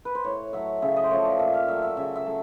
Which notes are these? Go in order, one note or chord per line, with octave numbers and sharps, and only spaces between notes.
B4
C5
A2 C#5
F#3 A3 E5
C#3 E5
D#5
C5
F3 A3 C#5
D5
A#2 E5
F5
F#3 A3 E5
E5
C#3 E5
E5
F#3 A3